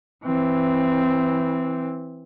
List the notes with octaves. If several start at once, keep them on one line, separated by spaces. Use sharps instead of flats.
E3 C4